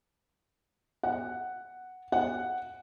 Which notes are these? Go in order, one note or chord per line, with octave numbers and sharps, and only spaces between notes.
F#5
F#5